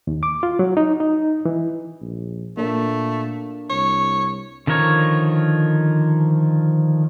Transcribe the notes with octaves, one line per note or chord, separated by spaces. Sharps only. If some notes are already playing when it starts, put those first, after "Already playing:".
D#2
D6
F4
F#3
D#4
D#4
E3
A#1
A#2 A3 A#3 D4
C2 C#5
D3 D#3 F3 A#4 C#5